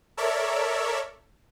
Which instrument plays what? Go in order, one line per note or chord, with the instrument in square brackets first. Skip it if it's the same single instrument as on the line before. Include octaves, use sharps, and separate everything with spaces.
[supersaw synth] A4 A#4 C#5 D5 E5